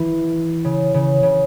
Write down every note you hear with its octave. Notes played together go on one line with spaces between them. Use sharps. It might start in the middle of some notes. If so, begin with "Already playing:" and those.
Already playing: E3
C#3
C#3
C#3